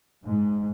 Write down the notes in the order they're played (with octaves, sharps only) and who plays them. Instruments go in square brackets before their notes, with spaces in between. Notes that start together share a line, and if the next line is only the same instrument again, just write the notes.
[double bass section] G#2